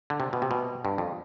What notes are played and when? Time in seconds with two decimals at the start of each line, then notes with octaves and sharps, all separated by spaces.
0.10 D3
0.20 C3
0.33 B2
0.42 C3
0.51 B2
0.85 G2
0.98 F2